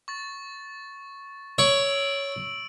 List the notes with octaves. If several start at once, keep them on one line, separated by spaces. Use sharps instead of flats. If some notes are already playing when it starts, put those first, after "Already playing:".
C#6 A6
C#5 E6 D7 F#7